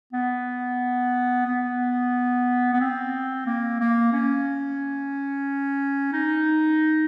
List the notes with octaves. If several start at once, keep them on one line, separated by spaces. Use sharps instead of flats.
B3
B3
B3
C4
A#3
A#3
C#4
D#4